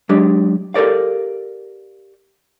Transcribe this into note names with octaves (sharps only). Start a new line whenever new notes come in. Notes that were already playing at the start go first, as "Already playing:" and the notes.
F#3 G#3 D4 G4
G4 A4 A#4 D5 F5